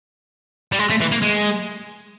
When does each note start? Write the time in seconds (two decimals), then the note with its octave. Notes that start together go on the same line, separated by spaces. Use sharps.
0.72 G3
0.79 G#3
0.90 A3
1.01 E3
1.11 A#3
1.22 G#3